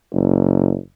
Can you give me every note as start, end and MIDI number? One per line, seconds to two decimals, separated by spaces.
0.13 0.77 30